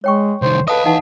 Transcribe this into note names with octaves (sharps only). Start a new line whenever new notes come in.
G#3 C#5 G5 C#6
C2 D#3 C5
A4 B4 D#5 F5 A5 D#6
E3 D#4 F#5 A5